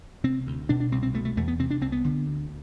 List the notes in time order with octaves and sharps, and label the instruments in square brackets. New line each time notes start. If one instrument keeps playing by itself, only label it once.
[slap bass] C3 C4
D2
B2 D4
D4
C2 C4
C4
B2 A3
A3
E2 A3
B3
C3 C4
D4
C2 C4
B3
D3
D2